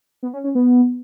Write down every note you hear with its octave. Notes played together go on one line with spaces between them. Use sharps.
B3
C#4
C#4
B3